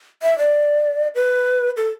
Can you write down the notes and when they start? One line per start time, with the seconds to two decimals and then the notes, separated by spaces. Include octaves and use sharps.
0.23 E5
0.38 D5
1.15 B4
1.77 A4